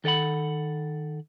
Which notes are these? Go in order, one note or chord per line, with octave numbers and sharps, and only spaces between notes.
D#3 A4 D5 F#5 B5